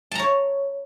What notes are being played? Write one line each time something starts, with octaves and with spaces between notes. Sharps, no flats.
C#5 A5 A#5